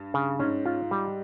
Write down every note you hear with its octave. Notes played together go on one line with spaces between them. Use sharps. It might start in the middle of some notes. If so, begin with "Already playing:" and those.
Already playing: G2
C#3
G#2 C#4
F4
G3